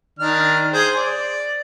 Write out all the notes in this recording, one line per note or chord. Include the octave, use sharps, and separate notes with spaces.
D#3 D4 F6
G#4 C5
D5